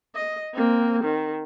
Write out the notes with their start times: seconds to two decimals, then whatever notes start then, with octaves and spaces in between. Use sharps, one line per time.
0.15 D#5
0.54 A#3 C4
1.04 D#3